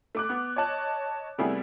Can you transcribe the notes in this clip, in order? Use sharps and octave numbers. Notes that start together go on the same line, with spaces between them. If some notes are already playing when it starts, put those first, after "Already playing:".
A3 D6 F#6
B3 F#6
C#5 D#5 A5 F#6
C3 G3 A3 B3 E4 G#4